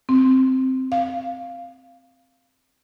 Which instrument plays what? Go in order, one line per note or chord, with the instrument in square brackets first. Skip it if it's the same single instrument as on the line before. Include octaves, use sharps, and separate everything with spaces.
[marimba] C4
F5